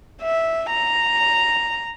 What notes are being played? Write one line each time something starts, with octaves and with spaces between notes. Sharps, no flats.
E5
A#5